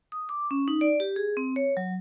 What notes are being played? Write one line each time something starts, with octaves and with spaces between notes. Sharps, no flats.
D#6
D6
C#4
D#4
D5
G4
G#4
C4
C#5
F#3